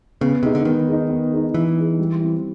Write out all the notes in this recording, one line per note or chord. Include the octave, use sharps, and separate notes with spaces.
C#3 B3
C3 D#4 G#4
D3
D#3 B3
D#4 G#4
B3
D#4 G#4
E3 B3
D#4 G#4
G3
C4 E4